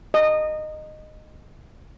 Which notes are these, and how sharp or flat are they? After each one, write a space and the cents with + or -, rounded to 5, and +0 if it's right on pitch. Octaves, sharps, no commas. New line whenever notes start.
D#5 -15